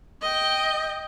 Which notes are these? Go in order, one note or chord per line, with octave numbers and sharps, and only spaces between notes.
D#5 G5